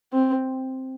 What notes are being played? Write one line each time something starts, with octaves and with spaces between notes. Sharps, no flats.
C4